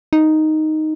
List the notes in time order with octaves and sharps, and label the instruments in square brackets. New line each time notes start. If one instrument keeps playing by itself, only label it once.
[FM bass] D#4